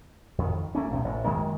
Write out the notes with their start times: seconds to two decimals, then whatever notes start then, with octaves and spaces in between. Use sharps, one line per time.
0.38 F2 D#3
0.75 A3 A#3 C#4
0.91 B1 E2 A2 C3
1.04 A1
1.24 F#2 D#3 G#3 A#3